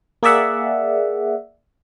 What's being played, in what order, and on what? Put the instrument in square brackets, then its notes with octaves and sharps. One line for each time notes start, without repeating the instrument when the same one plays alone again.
[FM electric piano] A#3 G#4 D5 E5 F#5